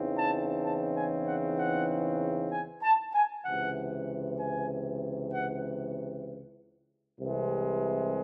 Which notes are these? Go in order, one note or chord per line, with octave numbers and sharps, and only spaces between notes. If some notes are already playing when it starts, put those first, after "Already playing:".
Already playing: E2 C#3 E3 C4 D#4
A5
A5
G#5
F#5
F#5
G#5
A5
G#5
C#2 C3 E3 F#5
G#5
F#5
C2 C3 E3 G#3